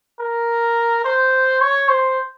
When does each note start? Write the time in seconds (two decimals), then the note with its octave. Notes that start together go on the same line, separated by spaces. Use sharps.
0.20 A#4
1.04 C5
1.61 C#5
1.89 C5